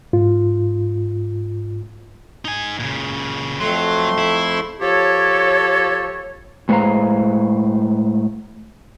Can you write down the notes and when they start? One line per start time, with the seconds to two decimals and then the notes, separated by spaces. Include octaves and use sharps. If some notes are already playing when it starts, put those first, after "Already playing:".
0.13 G#2 F4
2.45 D#4 G#5
2.80 A#2 C#3
3.60 F2 F#3 A3 C6
4.18 E4
4.81 F3 G4 A4 C#5
6.69 A2 G#3 B4 C5 F5 A#5